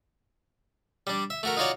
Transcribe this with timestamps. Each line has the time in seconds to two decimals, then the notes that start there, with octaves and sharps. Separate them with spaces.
1.07 G3 D4
1.30 E5
1.43 A3 F#4 A#4
1.57 D#4 F4 F#4 C#5 D5